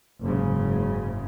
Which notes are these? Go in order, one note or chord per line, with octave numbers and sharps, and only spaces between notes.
F#1 G#2 C#3